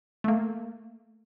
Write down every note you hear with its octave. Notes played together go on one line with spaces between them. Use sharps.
A3 A#3